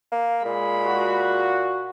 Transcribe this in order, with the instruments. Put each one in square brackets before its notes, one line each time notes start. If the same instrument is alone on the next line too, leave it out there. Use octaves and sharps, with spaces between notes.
[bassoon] A#3
[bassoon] A#2 [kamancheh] G#3 B5
[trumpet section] F#4